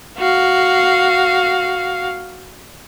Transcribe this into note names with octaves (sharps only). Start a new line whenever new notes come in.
F#4 F5